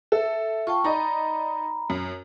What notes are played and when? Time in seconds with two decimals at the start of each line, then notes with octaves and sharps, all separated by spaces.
0.12 A4 E5
0.67 F4 G5 A5 C#6
0.84 D#4 D5 D#5 A#5 B5
1.90 F#2